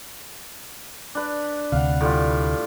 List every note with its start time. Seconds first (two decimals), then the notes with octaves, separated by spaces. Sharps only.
1.15 D4 B4
1.72 D2 C3 F5 F#5
2.01 A2 G3 F4